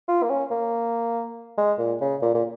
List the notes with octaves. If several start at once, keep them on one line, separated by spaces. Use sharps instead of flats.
F4
A#3
C#4
A#3
G#3
A#2
C#3
A#2
A#2